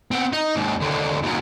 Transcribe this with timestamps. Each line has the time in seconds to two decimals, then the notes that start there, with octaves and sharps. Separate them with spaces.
0.11 B3 C4
0.33 D#4
0.56 D#2 G#2
0.80 D#2 D3
1.23 D#2 F#3